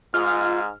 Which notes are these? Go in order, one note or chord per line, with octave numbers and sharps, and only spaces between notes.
G#2 G#3 F4 F6